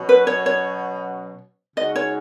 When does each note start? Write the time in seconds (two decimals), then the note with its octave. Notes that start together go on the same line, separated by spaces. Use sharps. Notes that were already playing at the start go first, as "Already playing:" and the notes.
Already playing: B2 F#3 C#4 F#4
0.09 B4
0.27 C#5
0.46 C#5
1.76 C#3 G#3 D#4 F#4 D#5
1.96 C#5